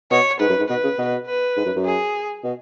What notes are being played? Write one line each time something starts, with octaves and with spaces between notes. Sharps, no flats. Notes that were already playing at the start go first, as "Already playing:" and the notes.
B2 C#5
G#2 B4
F#2
G#2
B2 B4
C#3
B2
B4
G#2
F#2
F#2
G#4
B2